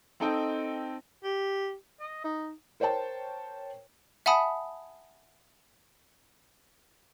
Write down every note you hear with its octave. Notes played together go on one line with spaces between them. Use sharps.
C4 D#4 A4 D#5 G5
G4
D#5
D#4
A#4 C5 C#5 G5 A5
E5 F#5 G#5 A5 B5 D#6